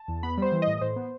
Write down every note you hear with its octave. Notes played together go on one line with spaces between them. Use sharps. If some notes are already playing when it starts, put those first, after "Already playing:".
Already playing: A5
E2
B3 B5
G3 C5
E3
D#5
A2
A2 C5
B3